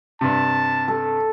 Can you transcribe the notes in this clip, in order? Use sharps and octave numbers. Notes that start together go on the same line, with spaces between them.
G2 C3 A5
A4